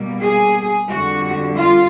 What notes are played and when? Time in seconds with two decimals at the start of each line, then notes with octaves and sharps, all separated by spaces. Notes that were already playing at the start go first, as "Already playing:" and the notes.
Already playing: B2 G3 A#3
0.23 G#4
0.89 F2 D3 G3 F#4
1.56 F4